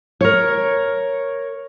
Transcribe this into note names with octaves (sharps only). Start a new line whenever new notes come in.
A#4 C#5